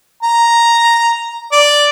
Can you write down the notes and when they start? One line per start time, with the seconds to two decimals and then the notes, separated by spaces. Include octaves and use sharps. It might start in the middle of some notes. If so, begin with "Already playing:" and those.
0.23 A#5
1.52 D5